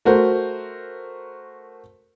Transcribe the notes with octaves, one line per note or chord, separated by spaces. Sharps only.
A3 F#4 A#4 C5